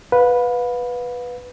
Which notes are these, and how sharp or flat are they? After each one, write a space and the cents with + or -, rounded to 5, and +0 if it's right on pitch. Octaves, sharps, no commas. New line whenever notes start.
B4 +0 F5 +40